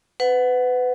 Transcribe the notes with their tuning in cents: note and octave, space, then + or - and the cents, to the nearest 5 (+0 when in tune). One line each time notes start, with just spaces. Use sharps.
B4 +30 F#5 -5